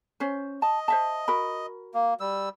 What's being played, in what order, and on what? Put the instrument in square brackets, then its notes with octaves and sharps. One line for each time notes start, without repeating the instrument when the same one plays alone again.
[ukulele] C#4 C5
[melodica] D#5 [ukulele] A5
[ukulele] C5 E5 A5
F#4 A#4 B5
[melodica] A#3
G3 E6